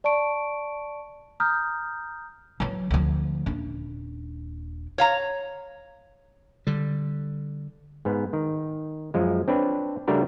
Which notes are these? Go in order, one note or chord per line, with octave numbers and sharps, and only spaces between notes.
D5 A5 C#6 D7
A#5 D#6 F6 G6
E3 F#3
D2 F3
D#1 D4
C#5 F5 A#5
D3 G3
G#2 B3
D#3
F#2 F3 G#3
C4 D4 B4 C#5
C#3 G3 A3 D4 F#4 A#4